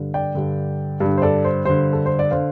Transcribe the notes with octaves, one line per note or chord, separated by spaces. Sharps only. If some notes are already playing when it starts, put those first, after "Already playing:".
Already playing: G2 D3
D5 G5
G2 D3
G2 D3
C5
A4 D5
C5
G2 D3 C5
A4
C5
D5
D3 C5 F5